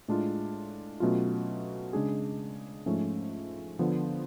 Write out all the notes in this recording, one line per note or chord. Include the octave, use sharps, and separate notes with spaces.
A2 G#3 D4 F4
B2 F#3 A3 C#4 F4
C#3 G#3 D4 G#4
G#2 F3 A3 C#4
D3 F3 B3